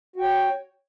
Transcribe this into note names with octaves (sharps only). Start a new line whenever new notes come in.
F#4 C#5 G5